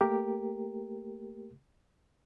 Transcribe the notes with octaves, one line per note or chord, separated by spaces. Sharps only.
A3 A#3 G4 A#4